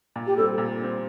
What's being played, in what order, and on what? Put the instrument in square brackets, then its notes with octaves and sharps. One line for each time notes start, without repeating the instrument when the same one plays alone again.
[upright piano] A#2
[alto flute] G4
[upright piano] G3 C4 [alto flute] A4
[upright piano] A#2
G3 C4